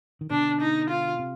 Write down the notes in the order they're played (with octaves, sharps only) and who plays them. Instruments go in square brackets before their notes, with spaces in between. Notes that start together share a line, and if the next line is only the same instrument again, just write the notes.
[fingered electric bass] D#3
[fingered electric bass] B2 D3 [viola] D4
[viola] D#4
F4
[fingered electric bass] C3